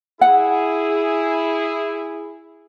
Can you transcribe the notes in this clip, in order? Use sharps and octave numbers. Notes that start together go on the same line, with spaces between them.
E4 G#4 F#5